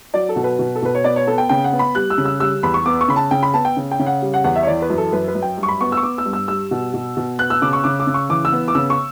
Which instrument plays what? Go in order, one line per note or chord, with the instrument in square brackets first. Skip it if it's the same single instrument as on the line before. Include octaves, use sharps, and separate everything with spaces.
[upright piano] F#3 D5
A4
B2
B4
B2
A4
B2 B4
C#5
B3 D5
C#5
B3 A4
G5
C#3 G5
F#5
B3
B5
G3 F#6
E6
C#3
E6
G3 E6
E2 B5
C#6
B3 D6
C#6
C#3 B5
A5
C#3 G5
B5
B3 A5
G5
C#3
G5
C#3
F#5
G3
F#5
E2 F#5
E5
C#5
E3 D5
B4
F#2
A4
F#2 B4
B4
F#2
G5
G2
C#6
B5
B3 C#6
E6
C#6
B3 D6
E6
G2
E6
G3 E6
B2
B2
B2
B3 F#6
E6
C#3 D6
C#6
C#3 D6
D6
C#3
C#6
E3 D6
E6
B3
D6
C#3 E6
C#6